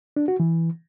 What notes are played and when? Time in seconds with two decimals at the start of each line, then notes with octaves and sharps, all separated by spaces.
0.16 D4
0.28 F#4
0.40 E3